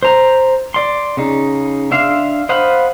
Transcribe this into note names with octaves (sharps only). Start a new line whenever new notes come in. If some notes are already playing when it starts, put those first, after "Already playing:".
C5 A#5
D5 C6
C#3 D#4
D4 E5 F5 C6
C5 D#5 F5 F#5 B5